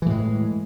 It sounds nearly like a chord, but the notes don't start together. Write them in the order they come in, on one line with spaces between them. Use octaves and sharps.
E3 A2 G#3